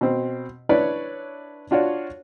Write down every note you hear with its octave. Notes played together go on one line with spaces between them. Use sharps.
B2 C4
D4 E4 B4 C#5 D5
D4 F4 F#4 C#5 D5